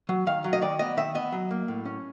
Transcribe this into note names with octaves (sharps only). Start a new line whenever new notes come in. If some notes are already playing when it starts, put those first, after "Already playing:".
F#3
D#3 F5
F#3
D#5
D#3 D5
B3 D#5
D#3 E5
B3 D#5
F#3
A#3
A2
C#4